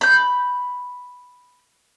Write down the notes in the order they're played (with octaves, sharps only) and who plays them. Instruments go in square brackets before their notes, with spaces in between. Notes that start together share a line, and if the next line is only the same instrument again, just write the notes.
[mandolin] B5 G6